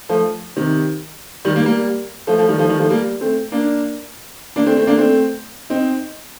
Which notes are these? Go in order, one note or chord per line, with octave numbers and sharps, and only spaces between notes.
F3 A3
C3 D#3
D#3 G3
G3 A#3
G3 A#3
F3 A3
F3 A3
D#3 G3
F3 A3
D#3 G3
F3 A3
G3 A#3
A3 C4
A#3 D4
A#3 D4
A3 C4
A3 C4
A#3 D4
A3 C4
C4 D#4